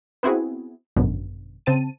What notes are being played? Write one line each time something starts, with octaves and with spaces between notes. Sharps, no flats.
B3 C4 E4 F#4 G#4
G#1 F#2 B2 D3
C#3 C4 A5 D#7